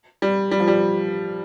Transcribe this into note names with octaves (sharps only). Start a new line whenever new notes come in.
G3
G3
F3
G3